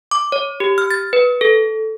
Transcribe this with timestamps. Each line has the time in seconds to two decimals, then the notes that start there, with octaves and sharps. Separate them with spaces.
0.11 D6
0.32 C#5
0.60 G4
0.78 F6
0.90 A6
1.13 B4
1.41 A4